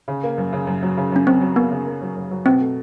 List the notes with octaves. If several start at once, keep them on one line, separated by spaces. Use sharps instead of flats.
C#3
A#3
F#2
C#3
F#2
F#3
C#3
F#2 C#4
F#2 C4
F#3
A#3 B3
C#3
A#3
F#3
F#2
F#3
B2 C4
A3